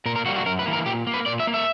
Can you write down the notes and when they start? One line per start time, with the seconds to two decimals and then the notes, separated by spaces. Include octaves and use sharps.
0.06 A#2 A#4
0.16 A#4
0.26 G3 A#3 F#4
0.36 F#4
0.46 F#2 A#4
0.59 B4
0.66 E3 A#3
0.73 A#4
0.86 A#2 G4
1.07 A#3
1.14 B4
1.26 A#2 D5
1.40 E5
1.47 A#3
1.54 E5